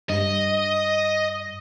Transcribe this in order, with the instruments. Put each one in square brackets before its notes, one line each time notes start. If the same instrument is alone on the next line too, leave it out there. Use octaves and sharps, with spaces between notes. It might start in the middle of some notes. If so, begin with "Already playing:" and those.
[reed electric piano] G2 [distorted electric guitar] D#5